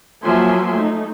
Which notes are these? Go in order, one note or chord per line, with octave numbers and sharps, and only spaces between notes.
F3 F#3 A#3 E5 G#5 C6
A3 D#4